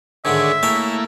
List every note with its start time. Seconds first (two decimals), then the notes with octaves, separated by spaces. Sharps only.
0.25 G#2 D3 D#3 D4 G#4 C#5 E5
0.63 A3 A#3 E4 C#5 G5 G#5